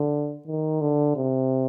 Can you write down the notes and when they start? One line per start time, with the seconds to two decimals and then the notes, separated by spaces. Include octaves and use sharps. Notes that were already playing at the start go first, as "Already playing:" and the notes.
Already playing: D3
0.47 D#3
0.81 D3
1.16 C3